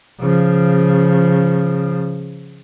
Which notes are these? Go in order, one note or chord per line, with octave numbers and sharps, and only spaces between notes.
C#3 F3